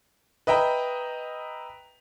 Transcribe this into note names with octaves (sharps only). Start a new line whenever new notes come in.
B4 D#5 E5 G5 A#5